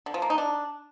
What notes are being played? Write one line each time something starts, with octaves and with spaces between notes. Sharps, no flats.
D3
F3
A#3
D#4
D4